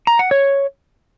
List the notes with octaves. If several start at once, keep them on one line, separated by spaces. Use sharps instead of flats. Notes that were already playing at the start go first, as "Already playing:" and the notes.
A#5
F#5
C#5